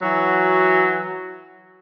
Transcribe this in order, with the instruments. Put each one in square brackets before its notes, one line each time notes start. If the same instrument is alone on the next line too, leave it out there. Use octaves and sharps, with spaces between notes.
[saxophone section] E3 F#3 F#4